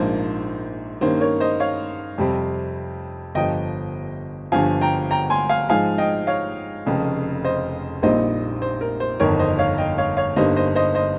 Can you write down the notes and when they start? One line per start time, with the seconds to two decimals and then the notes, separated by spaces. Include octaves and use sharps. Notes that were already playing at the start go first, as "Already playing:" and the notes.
Already playing: A#1 G#2 F3 A#3 C5
1.01 G2 D#3 A#3 C#4 C5
1.21 A#4 C#5
1.40 C5 D#5
1.60 C#5 F5
2.18 F2 C3 G3 C4
3.35 G1 G2 F3 D#5 G5
4.52 G1 G2 F3 F5 G#5
4.81 G5 A#5
5.11 G5 A#5
5.30 G#5 C6
5.49 F5 G#5
5.69 G#2 F3 G#3 F5 G#5
5.98 D#5 G5
6.27 C#5 F5
6.86 F1 F2 C#3
7.45 C5 D#5
8.03 A#1 A#2 G3 C4 D#4 C5 D#5
8.62 C5
8.81 A#4
9.00 C5
9.20 G1 F2 D#3 A#4 C#5
9.39 C5 D#5
9.58 C#5 F5
9.78 D#5 G5
9.98 C#5 F5
10.17 C#5 F5
10.36 G1 G2 G3 A#3 D#4 C5 D#5
10.56 C5 D#5
10.76 C5 D#5
10.95 C5 D#5